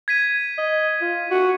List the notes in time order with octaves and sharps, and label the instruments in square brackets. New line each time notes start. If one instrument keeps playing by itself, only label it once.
[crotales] G#6 B6 D#7
[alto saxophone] D#5
F4
F#4